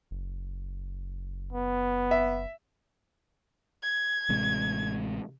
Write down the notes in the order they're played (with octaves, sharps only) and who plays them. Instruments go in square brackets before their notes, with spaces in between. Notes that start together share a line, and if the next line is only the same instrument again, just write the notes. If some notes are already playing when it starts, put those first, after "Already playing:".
[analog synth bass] F#1
[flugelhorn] B3
[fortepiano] E5
[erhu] G#6
[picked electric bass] A1 C3 G#3